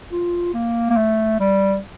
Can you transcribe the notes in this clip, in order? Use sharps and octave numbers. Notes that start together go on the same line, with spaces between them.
F4
A#3
A#3
A3
G3